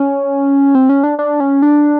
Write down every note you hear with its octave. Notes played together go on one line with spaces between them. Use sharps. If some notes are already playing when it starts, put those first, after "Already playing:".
Already playing: C#4
C4
C#4
D4
D4
C#4
D4